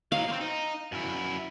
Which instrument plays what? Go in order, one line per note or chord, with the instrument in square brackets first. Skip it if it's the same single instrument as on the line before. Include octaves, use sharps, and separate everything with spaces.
[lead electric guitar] F#3 D#4 [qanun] F5
[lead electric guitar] A#3 C4
D#4
F#2 E4